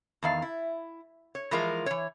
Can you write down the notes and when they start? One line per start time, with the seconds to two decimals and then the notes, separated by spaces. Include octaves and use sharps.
0.23 E2 D#3 F5
0.42 E4
1.35 C#5
1.51 E3 F3 G#3 F4 A#4
1.86 E3 C#5